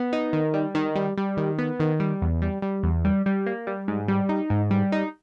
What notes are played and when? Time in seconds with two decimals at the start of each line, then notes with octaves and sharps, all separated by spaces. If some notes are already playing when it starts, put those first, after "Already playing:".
Already playing: B3
0.13 D#4
0.33 D#3
0.54 G3
0.75 D#3
0.95 G3
1.18 G3
1.37 D#3
1.59 B3
1.80 D#3
2.00 G3
2.22 E2
2.42 G3
2.62 G3
2.83 E2
3.05 G3
3.26 G3
3.46 A#3
3.67 G3
3.88 G#2
4.08 G3
4.29 D#4
4.50 G#2
4.71 G3
4.92 D#4